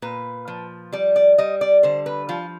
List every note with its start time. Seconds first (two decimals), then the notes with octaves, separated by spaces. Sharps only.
0.02 A#2 B4
0.48 F3
0.93 G3 D5
1.16 D5
1.38 G3 D#5
1.61 D5
1.83 D3 C5
2.06 B4
2.29 F3 F4